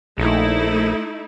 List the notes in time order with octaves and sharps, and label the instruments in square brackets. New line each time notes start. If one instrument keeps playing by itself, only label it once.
[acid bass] A#1 [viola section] A3 D#4 E4